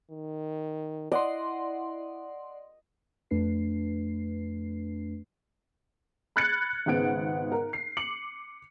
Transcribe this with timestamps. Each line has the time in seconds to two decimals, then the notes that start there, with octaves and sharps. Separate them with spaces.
0.10 D#3
1.12 E4 D5 D#5 F#5 C6
3.31 F2 A3 D4 B4 C7
6.36 B5 F6 F#6 G#6 A6 C#7
6.86 G#1 C#3 B3 F#5 D7
7.52 A#4
7.73 C7
7.97 D6 C#7 F#7